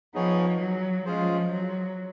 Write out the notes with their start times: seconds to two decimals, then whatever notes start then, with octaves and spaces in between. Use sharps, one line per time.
0.14 F3 B3 D#4 G#4 C#5
0.60 F#3
1.05 F3 G#3 C#4 F4 G#4 C5
1.51 F#3